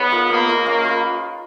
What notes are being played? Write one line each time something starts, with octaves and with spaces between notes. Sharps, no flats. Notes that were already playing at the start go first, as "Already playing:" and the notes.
Already playing: B3 D#4 G#4 C#5
F4 A#4
A#3 B3
F4 A#4
A#3 C#4
F4 B4